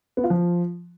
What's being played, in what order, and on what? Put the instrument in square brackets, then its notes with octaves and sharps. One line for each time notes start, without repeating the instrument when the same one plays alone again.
[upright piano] B3
F4
F3